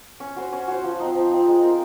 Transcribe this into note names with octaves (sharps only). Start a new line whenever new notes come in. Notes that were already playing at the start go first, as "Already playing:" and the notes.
C#4
F#4 C5
C#4
F#4 C5
F3
C4 D#4
F3
C4 D#4
G#3
C4 F4 A#4